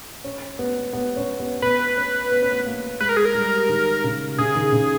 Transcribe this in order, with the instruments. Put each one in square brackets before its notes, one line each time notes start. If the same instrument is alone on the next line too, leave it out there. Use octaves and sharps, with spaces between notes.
[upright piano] C#4
B3
B3
C#4
B3
[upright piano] B3 [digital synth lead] B4
[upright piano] C#4
B3
C#4
B3
A#3
[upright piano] G#3 [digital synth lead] B4
[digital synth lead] A#4
G#4
A#4
[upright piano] G3
D#3
C#3
[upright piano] C#3 [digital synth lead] G#4
[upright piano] D#3
C#3